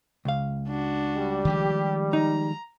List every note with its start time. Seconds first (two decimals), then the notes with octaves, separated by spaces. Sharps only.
0.25 C#2 F5
0.68 D4 F#4
1.16 G3
1.45 D#3 F3 G#3 G4
2.13 D#4 A#5